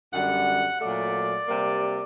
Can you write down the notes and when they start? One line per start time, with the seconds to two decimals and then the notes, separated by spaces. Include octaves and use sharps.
0.13 F#2 D3 G3 F#5
0.81 A#2 F#3 A3 D5
1.47 C3 G3 A#3